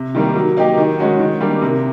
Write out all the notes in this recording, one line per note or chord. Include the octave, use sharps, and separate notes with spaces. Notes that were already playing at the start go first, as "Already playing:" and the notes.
Already playing: C3
D#3 G3 A#3
F#3
A#3 D#4 G4
D#3
G#3 C#4 F#4
D#3
G3 A#3 D4
C3